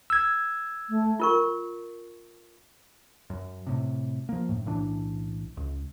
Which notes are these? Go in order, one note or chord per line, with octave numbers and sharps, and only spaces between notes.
E6 G#6
A3
F4 A#4 C#6
F#2
A2 C3
F3 A#3
F#2 A2
B1 A2 E3 D4
C#2